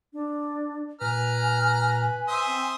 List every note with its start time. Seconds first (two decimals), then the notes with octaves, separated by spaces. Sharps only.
0.13 D4
1.01 A#2 B4 G#5 A#5 F6
2.28 C5 E5 D#6
2.48 C4